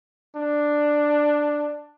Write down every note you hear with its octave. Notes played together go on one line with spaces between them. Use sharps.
D4